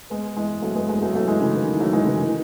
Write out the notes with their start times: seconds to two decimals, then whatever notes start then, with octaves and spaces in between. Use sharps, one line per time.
0.10 G#3 B3
0.36 E3 G#3
0.62 F#3 A3
0.76 G#3 B3
0.89 G#3 B3
1.02 F#3 A3
1.15 F#3 A3
1.28 E3 G#3
1.41 C#3 E3
1.54 D#3
1.67 D#3
1.80 F#3 A3
1.93 E3 G#3
2.06 C#3 E3
2.19 D#3